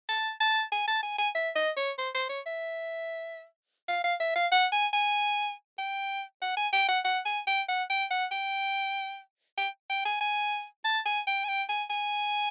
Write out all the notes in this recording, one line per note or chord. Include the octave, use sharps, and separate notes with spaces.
A5
A5
G#5
A5
G#5
G#5
E5
D#5
C#5
C5
C5
C#5
E5
F5
F5
E5
F5
F#5
G#5
G#5
G5
F#5
G#5
G5
F#5
F#5
G#5
G5
F#5
G5
F#5
G5
G5
G5
G#5
G#5
A5
G#5
G5
G#5
G5
G#5
G#5